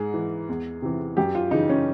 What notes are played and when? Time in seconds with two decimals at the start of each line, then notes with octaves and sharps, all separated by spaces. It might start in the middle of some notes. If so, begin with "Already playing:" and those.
Already playing: G#2 G#4
0.14 E3
0.49 E2
0.82 C3 E3
1.17 F#2 G4
1.35 F4
1.51 C#3 E3 D#4
1.69 C#4